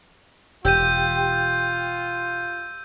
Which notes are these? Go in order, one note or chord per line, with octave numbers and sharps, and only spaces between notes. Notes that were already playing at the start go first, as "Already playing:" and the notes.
E1 F4 G4 E6 G6 D#7